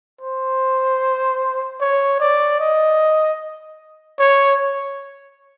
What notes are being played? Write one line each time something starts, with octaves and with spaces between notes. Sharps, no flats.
C5
C#5
D5
D#5
C#5